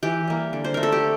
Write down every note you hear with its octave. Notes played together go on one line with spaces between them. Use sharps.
E3 G4
G3 A#3
D3
C5
A3 A#4
A4
G4